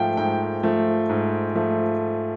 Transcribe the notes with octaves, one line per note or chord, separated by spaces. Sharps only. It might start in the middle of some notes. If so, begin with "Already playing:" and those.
Already playing: G#2 F3 A3 F5 G5
G#2 G5
F3 A3
G#2
F3 A3